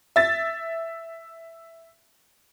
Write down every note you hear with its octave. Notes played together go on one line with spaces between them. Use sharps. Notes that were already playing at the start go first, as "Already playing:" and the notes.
E5 A6